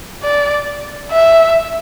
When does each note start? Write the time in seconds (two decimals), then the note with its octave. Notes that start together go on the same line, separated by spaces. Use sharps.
0.24 D5
1.12 E5